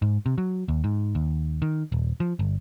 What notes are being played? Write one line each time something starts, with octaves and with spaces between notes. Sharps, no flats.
G#2
C3
F#3
D#2
G#2
D#2
D#3
D#1
F3
G1